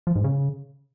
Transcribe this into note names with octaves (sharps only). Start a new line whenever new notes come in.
F3
G#2
C#3